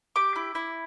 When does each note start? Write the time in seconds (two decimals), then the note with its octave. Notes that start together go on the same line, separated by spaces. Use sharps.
0.16 G4 D6
0.36 E4
0.55 E4